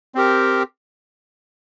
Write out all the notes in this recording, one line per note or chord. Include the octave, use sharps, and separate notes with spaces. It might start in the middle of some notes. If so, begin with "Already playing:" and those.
C4 G4 A#4